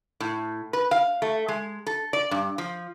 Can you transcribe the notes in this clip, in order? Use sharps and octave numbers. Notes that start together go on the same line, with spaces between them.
A2
B4
F5
A3
G#3
A4
D5
G2
F3